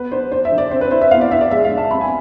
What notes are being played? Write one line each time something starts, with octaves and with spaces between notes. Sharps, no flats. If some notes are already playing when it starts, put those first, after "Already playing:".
Already playing: B3 B4
D4 C5
D4 C5
E5
D3
D5
C4 C5
B4
E4 C5
E5
B3 F5
D5
D4 E5
D5
G#3 E5
F5
D4
A5
C4 B5
G#5